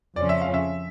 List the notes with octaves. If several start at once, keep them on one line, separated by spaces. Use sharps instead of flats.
F2 C#3 F3 C#4 D5
E5
F5
E5